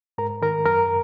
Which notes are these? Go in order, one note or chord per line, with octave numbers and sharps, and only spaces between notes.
G#2 A#4 A#5
D#3 A#4 A#5
F#2 A#4 A#5